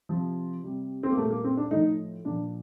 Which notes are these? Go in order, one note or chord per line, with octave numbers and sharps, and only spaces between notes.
C3 F3
C3 G3
C4
A#3
A#2 G3 A3
A#3
C4
D4
A2 F3 D#4
A#2 F3 D4